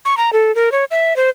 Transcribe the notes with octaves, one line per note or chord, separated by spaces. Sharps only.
C#6
A#5
A4
A#4
C#5
E5
C5